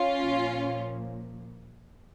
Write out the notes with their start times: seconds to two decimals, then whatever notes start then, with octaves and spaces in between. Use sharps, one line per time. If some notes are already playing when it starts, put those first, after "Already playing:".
Already playing: C#4 F4
0.20 A#2 F3